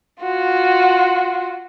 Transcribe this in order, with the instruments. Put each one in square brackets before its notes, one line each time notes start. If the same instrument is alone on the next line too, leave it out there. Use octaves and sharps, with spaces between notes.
[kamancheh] F4 F#4